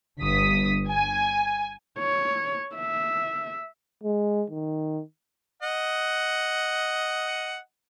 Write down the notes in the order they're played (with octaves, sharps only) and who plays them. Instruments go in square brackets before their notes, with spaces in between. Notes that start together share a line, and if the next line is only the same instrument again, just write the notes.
[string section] G1 D#6 B6
G#5
[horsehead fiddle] C#5
E5
[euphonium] G#3
D#3
[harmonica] D#5 F#5